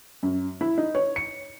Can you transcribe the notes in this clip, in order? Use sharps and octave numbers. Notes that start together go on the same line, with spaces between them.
F#2
E4
D#4
C#5
C#7